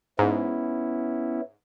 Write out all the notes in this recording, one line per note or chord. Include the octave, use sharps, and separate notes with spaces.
G#2 B3 C#4 E4